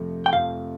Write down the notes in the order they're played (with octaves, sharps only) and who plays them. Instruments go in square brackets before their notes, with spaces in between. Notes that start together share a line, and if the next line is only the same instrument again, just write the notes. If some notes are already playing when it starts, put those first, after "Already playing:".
Already playing: [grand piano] F2 C3 F3 A3
[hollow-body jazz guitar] G5
[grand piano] F2 C3 F3 A3 [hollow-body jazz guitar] F5